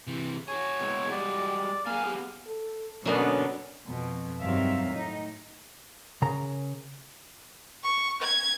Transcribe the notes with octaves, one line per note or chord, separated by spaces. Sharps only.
C3 E3
F#4 G#4 C#5
B2 G#3 E4
G3 G#3 D5
F#3 A#3 G#4 F5 G#5
B3 G4 G#4
A4
B2 D3 F#3 A#3 B3 C#4 D4
F2 B2
G2 D#3 F#3 C4 E5 F5
A2 D#4
C#3 A#4 A#5
C#6
G#6